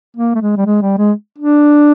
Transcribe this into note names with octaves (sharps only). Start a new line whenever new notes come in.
A#3
A3
G#3
G3
G#3
G3
G#3
D4